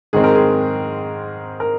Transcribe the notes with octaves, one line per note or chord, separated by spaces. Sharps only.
G#2 D#3 G#3 C4 G#4
A#4
G#4
A#4